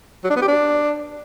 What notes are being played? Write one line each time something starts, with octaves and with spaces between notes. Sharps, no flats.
F#3
D4
B3
G4
D4